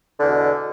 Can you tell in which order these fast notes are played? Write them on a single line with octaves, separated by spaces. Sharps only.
D3 E2 B2